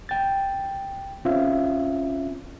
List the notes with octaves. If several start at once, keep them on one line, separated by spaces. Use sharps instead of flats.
G5 A6
C4 C#4 F4 E5 F5